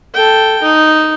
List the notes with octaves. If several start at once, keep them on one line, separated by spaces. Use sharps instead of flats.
A4 G5
D#4